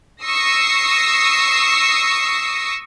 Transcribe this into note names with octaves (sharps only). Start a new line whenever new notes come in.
C#6 D#6 E6 A#6 C7